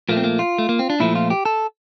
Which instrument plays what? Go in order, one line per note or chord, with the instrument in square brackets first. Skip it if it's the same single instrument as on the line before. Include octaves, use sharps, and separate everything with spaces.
[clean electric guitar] A#2 F3 A3 A#3
C4
A#3
F4
A3
A#3
C4
D4
A#2 F3 A3 E4
F4
G4
A4